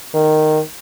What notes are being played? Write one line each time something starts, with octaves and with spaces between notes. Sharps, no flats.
D#3